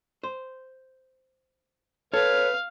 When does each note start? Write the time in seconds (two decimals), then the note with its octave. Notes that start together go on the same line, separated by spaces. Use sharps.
0.23 C5
2.14 A4 B4 C#5 F5